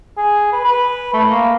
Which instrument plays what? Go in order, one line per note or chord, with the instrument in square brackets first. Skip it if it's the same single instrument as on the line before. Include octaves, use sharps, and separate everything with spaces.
[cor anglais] G#4
B4
B4
A3
A#3